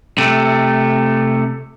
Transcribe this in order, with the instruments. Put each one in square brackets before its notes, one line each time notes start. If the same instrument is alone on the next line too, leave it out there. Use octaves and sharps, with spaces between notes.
[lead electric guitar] C3 A3